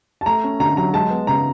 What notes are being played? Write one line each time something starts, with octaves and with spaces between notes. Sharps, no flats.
A5
A3 A#5
C#4
D3 A#5
F#3 A#5
G#3 A5
B3
C#3 A#5